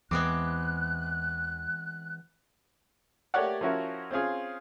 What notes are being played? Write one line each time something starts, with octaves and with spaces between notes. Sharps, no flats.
E2 E3 G#3 B3 C4 D6 F#6
A3 A#3 G4 C#5 D5 F#5
F3 C#4 E4 F#4 A#4
C4 C#4 F4 G#4